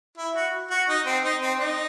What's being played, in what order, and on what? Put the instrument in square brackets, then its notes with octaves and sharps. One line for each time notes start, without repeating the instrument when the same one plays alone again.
[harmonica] E4
F#4
F#4
D#4
C4
D#4
C4
D#4